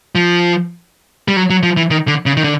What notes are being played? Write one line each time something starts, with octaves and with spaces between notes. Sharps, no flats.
F3
G3
F#3
F#3
F3
E3
D#3
D3
C#3
D#3
D3